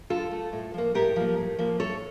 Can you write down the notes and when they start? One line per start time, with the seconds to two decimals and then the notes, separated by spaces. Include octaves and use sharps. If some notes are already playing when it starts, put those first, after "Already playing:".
0.10 D3 F4 A4
0.31 A3
0.53 A2
0.74 F3 A#3
0.95 A2 G4 A#4
1.16 F3 A#3
1.37 A2
1.58 F3 A#3
1.80 A2 A4 C#5